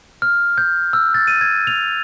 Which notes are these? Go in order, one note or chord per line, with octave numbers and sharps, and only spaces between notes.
F6
G6
E6
A6
D#7
G#6
F7